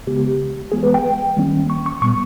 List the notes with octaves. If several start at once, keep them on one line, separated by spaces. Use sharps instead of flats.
C#3 G#3 B3 G4
E3 G#3 B3 G#4
B4
G5
D#3 G3 A#3 C#4
C#6
C#6
A#2 G3 B3 C#6